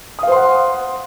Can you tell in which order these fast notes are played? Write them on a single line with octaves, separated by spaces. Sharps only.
D#6 F5 C5 C6 F#5